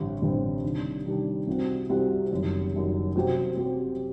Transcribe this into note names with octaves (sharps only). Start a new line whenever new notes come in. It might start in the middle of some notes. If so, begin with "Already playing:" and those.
Already playing: A1 G2 D3 G3 C4
A1 G2 D3 G3 C4
C3 D#3 G3 D4
C3 D#3 G3 D4
C2 C3 G3 C4 F#4
C2 C3 G3 C4 F#4
F#1 F#2 D#3 G3
F#1 F#2 D#3 G3
C3 F#3 C4 G4
C3 F#3 C4 G4